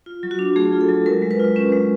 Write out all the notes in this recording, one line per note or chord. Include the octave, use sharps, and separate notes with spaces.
F4
F#3
F#4
D4
A3 G#4
F4
A4
F#3
G#3 A#4
G#3
B4
F4
C#4 B4
G#3